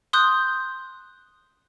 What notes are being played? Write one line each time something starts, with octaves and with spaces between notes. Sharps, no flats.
C6 D#6 F#6 G6